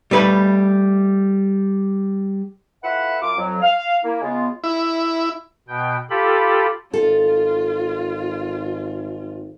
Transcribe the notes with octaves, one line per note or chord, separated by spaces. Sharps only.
G3 A3 B4 B5
A3 E4 F4 B4 E5 F#5
F#2 F4 D6
F2 F#3
F5
A#3 E4
C#3 G#3 B3 F4
E4
B2 G5
F4 G4 A4 B5
G#1 F4 A4